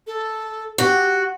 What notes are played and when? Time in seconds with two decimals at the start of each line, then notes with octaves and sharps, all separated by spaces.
0.07 A4
0.78 F#4 G4